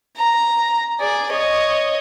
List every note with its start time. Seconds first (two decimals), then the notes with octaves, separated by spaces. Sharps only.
0.17 A#5
1.00 G#4 D5
1.31 C#5 D#5